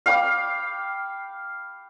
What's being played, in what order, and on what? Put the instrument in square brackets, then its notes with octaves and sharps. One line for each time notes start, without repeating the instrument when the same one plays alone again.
[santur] F5 G5 B5 D6